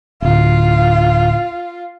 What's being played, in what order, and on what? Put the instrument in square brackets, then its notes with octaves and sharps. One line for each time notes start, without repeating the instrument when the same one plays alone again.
[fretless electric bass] D1 [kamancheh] F4